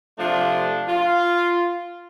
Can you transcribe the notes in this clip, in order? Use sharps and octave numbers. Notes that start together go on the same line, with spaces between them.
C3 F3 A3 D4
F4